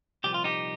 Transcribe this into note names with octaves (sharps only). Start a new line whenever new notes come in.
C2 A#2 F3 G4
F4
D#4 G4